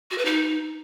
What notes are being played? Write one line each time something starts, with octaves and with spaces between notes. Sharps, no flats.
F#4
B4
D#4